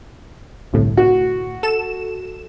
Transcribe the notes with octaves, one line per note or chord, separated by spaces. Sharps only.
G1 C2 A2
F#4
A4 E7